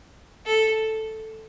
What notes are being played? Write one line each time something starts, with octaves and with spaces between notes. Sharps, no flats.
A4